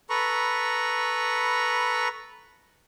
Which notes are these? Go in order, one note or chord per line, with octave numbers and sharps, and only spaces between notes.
A4 B4 A#5 B5 C#6